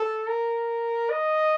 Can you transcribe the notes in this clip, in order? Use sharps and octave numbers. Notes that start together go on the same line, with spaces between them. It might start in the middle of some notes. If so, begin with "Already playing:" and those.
Already playing: A4
A#4
D#5